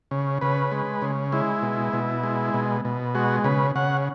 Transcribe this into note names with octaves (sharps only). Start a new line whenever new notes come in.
C#3
C#3 B4
G#3
C#3
G#3 E4
B2
B2
G#3
B2
B2
G#3 F#4
C#3 B4
C#3 F#5